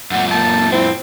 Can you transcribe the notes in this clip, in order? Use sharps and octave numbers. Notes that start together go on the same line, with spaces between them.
F#2 A#2 F#5
A#3 A5
C4 E4